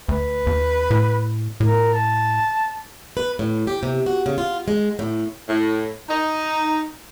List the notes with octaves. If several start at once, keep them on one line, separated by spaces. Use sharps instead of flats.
D2 B4
D#2
A2
A2 A#4
A5
B4
A2
G4
C3
F#4
C#3
F4
G#3
A2
A2
D#4